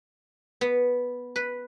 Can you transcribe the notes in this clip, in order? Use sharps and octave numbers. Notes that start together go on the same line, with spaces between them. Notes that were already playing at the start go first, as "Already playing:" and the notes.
B3
B4